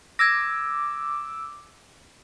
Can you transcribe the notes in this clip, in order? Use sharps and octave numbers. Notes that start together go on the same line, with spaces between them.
D6 E6 G#6 A#6